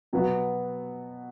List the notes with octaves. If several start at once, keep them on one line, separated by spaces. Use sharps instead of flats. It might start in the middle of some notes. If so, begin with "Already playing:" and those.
B2 F#3 B3 F#4